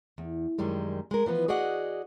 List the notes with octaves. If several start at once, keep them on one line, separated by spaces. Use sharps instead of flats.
E2
F#2 D#3 G3 G#3
G#3 A#4
E3 F3 B3 B4
F#4 G#4 D5 D#5 F#5